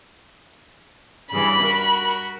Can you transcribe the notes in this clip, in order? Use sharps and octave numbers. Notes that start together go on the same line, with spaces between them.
G2 C#3 E3 B5
F#4 A#4